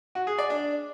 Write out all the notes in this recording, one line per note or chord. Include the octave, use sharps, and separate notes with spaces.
F#4
G#4
D5
D4